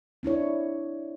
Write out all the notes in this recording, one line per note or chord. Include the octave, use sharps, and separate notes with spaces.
C4 D4 E4 C#5